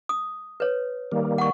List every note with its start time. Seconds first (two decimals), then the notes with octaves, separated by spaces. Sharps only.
0.09 D#6
0.60 B4 C#5
1.12 D#3 G3 A#3
1.38 F#5 C#6